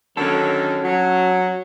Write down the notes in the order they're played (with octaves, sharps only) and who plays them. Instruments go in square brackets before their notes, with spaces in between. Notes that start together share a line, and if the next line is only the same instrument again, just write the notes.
[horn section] D3 D#3 F#3 [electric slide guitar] C#4 A4
[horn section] F#3